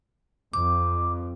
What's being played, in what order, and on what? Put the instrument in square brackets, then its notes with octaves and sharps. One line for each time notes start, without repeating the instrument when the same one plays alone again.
[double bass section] F2 [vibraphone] D6